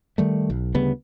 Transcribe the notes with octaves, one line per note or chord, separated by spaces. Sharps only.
D#3 G3 A3
B1
D2 C#3 G3 B3